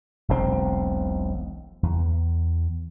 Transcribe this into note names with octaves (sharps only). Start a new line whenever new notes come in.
E1 B1 C#3 C4
E2